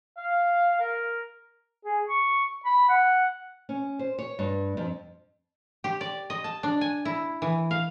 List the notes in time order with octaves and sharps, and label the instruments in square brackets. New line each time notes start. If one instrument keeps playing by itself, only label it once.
[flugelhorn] F5
A#4
[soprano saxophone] G#4
C#6
B5
F#5
[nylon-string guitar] C#4
C5
C#5
G2
F2
[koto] G4
D5
D#5
A5
D4
G#5
E4
E3
F5